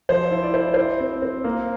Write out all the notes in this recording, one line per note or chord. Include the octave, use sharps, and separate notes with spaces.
F3 C5
E4
D5
E4 C5
E4 C5
C4
C4
A#3